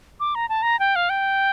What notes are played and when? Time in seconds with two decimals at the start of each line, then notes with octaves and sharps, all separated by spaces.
0.20 D6
0.35 A#5
0.49 A5
0.63 A#5
0.79 G5
0.96 F5
1.10 G5